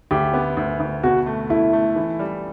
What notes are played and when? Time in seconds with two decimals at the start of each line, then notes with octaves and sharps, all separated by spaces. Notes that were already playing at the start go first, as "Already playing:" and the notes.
0.11 D2 G4
0.34 B3
0.57 D2
0.80 D2
1.03 B2 F#4
1.26 A3
1.50 A3 E4
1.73 A3
1.96 E3
2.19 G3